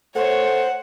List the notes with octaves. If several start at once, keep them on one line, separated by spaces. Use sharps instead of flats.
A3 C5 C#5 F#5